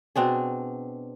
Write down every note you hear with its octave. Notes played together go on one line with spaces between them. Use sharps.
B2 C4 D4 G#4